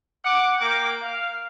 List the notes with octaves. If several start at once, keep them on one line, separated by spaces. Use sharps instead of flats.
F#5 D6
A#3 G5 D6
F5